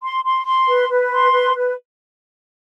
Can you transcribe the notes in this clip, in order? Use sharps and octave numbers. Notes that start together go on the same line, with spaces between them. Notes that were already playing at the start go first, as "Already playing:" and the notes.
C6
C6
C6
B4
B4
C6
B4
B4